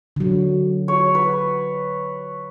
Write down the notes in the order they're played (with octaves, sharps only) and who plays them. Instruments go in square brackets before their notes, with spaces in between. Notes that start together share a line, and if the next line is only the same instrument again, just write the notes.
[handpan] D3 F#3
[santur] C#5
B4